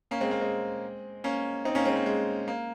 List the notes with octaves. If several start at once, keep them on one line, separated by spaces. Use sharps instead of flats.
A#3 C#4
G#3 C4
A#3
G#3 C4
A#3 C#4
C4 D#4
A#3 C#4
G#3 C4
A#3
G#3
A#3